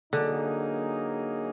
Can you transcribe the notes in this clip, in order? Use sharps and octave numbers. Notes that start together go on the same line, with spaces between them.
D3 F#3 A#3 D#4 G#4